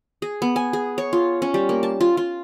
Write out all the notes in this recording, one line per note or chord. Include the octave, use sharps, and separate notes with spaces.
G#4
B3
G#5
G#4
C#5
F4
C#4
G3
A#3
A5
F4
F4